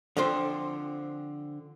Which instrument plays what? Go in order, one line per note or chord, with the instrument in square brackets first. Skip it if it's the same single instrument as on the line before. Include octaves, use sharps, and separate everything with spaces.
[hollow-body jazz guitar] D3 F3 C4 C5